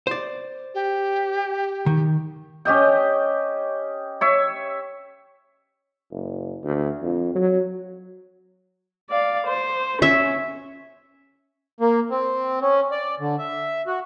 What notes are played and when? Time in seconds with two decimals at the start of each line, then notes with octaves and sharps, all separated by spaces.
0.07 C5 D5
0.74 G4
1.86 D#3
2.65 C#4 G4 D#5 G5
4.21 C#5 E5
6.11 F#1
6.64 D2
7.02 F2
7.35 F#3
9.10 D5 F5
9.46 C5
10.02 C#4 E5
11.80 A#3
12.10 C4
12.62 C#4
12.92 D5
13.20 D3
13.39 E5
13.87 F#4